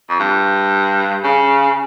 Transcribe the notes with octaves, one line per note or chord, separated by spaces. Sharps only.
F2
G2
C#3